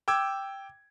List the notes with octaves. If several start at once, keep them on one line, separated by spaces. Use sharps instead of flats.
G5 D6 E6 G#6